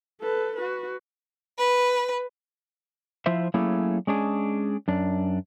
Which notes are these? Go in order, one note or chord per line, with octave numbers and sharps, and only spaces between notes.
A4 B4
F#4 B4
B4
F3 E4 F4 C5 E5
F#3 A3 A#3 C#4 E4 G#4
G#3 C#4 D4 G#4
F#2 D4